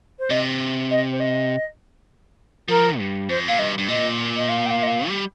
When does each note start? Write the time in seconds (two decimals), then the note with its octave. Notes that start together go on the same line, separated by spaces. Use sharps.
0.18 C5
0.30 C3 D#5
0.90 D#5
1.11 C5
1.19 D#5
2.68 F3 A#4
2.99 G2
3.29 F2 C5
3.47 A#2 F5
3.58 G2 D#5
3.78 G2
3.88 A#2 D#5
4.36 D#5
4.48 F5
4.65 G5
4.70 F5
4.82 D#5
4.87 F5
5.08 G3